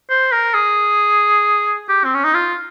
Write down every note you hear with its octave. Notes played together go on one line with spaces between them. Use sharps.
C5
A#4
G#4
G4
C4
C#4
D#4
F4